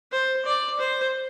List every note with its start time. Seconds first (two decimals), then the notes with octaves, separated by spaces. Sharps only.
0.12 C5
0.45 D5
0.79 C5